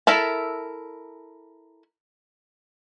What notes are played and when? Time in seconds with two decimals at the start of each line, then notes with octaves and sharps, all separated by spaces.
0.07 E4 A4 A#4 E5 A5